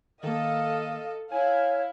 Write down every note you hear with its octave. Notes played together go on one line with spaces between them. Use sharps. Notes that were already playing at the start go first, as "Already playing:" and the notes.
D#3 A#3 A4 D#5 F5
E4 C#5 F5 G#5